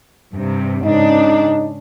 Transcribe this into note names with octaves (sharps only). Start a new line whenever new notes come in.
G2 C3
G#2 C#3 D4 D#4